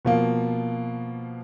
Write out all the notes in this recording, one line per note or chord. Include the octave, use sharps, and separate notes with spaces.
B2 F3 A#3